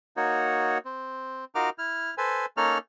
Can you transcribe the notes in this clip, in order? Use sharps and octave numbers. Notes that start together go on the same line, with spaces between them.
A#3 D#4 F#4 C#5
C4
D#4 F4 F#4 A#4 D6 F6
E4 F6
A4 B4 C5 G#5
A#3 C#4 D#4 A4 C#5 F6